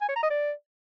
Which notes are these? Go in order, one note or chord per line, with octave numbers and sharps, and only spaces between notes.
G#5
C#5
A#5
D#5
D5